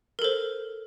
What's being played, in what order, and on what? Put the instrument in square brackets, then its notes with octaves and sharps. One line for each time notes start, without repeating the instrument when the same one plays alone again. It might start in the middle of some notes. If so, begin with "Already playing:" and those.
[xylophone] A#4
A4
C5